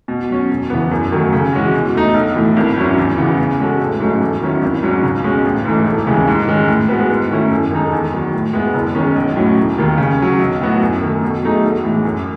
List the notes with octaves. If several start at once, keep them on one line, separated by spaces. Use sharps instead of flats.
B2
F#3 C#4
E1
E2 C#3 E3 B3
F#2
D#3 F#3 A3
C#3
E3 G#3 C#4 F#4
B2
A3 D#4
B1
A2 E3 A3
G#1
G#2 F#3 C#4 E4
E2
C#3 E3 B3
C#3
G#3 C#4 F#4 A4
A1
G#2 F#3 A3 C#4
E2
D#3 F#3 C#4 E4
G#1
G#2 F#3 C#4
C#2
B2 G#3 C#4
A1
G#2 E3 A3
E1
D#2 C#3 E3 G#3
G#2
D#3 G#3 C#4
A2
G#3 B3 F#4 B4
G#2
D#3 A3 C#4 E4
F#2
D#3 G#3 D#4 A4
E2
D#3 F#3
A2
G#3 B3 E4
F#1
E2 D#3 G#3 C#4
B1
A2 F#3 C#4
E1
D#2 D#3
C#3
F#3 C#4
B1
A2 F#3 B3 F#4
F#2
D#3 A3
B2
F#3 A3 D#4 G#4
B1
A2 E3 G#3
F#2